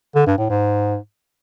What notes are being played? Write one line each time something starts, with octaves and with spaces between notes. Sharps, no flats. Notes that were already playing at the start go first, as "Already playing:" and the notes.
D3
G2
A2
G#2